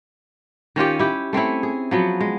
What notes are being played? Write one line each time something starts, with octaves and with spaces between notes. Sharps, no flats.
D#3 C#4 F4 G4
E4 G4
A3 C4 C#4 E4
G#4
F3 F#3 B3
G#3